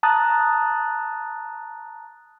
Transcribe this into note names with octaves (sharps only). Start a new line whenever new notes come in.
A5 A#5 D#6 F#6 A6